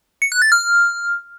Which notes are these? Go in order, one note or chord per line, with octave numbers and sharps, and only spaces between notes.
C#7
F#6
A6
F6